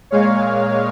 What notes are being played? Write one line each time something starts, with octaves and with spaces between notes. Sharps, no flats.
A#2 G#3 C#5 F5